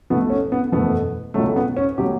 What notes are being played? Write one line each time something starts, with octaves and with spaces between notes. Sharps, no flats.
B1 B2 A3 B3
C#4
B3
F#1 E2 B2 A3 B3
C#2 B2 F#3 A3
B3
C#4
B2 F#3 A3 G4